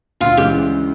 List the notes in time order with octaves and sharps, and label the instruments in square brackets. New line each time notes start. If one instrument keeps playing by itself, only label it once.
[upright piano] D2 [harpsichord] F4
[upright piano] C#3 E3 G#3 [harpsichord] G4